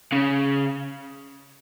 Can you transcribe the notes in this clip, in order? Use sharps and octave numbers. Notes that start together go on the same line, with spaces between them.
C#3